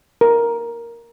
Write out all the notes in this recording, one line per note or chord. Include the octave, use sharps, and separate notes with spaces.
A#4